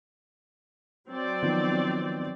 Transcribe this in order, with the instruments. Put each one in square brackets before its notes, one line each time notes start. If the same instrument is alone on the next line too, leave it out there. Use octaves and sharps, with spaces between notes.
[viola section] F#3 C4 D5
[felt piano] D#3 F3 B3